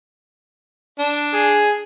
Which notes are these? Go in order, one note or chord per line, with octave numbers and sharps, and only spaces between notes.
D4
G#4